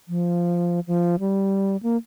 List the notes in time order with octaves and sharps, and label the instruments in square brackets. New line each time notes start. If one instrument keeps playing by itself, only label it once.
[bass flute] F3
F3
G3
A#3